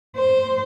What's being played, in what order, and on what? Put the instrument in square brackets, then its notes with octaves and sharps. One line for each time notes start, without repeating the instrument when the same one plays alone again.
[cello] C5